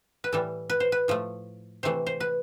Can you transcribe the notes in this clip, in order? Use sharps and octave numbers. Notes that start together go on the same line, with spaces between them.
B4
A2 E3 G3 A4
B4
C5
B4
A2 F3 A3
C3 E3 A3 C5
C5
B4